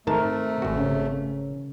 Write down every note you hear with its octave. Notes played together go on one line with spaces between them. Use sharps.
G#2 C3 D#3 A3 A#4 A5
G#1 F#4
C#3 C#4